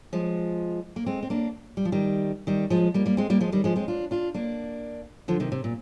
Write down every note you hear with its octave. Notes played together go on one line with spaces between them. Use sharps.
F3 G#3
A#3
G#3 C4
C4
A#3 D4
G3
F3
D#3 G3
D#3 G3
F3 G#3
G3 A#3
G3 A#3
G#3 C4
G3 A#3
F3 G#3
D#3 G3
F3 G#3
G#3 C4
D4 F4
D4 F4
A#3 D4
D3 F3
C3 D#3
C3
A#2